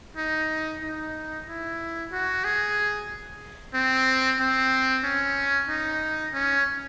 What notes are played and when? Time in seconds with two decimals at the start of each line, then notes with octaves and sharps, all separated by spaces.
0.17 D#4
0.82 D#4
1.46 E4
2.12 F#4
2.45 G#4
3.74 C4
4.39 C4
5.04 C#4
5.69 D#4
6.33 C#4